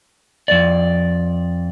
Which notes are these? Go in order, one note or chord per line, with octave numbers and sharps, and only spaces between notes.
F2 D5